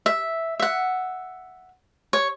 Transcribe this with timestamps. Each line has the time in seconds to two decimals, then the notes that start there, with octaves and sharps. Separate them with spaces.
0.06 E5
0.60 E5 F#5
2.13 C#5